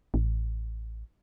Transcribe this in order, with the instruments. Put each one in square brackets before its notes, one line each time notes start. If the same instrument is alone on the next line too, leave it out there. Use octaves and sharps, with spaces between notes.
[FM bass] A1